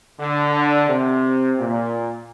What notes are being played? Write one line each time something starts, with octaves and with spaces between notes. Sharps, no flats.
D3
C3
A#2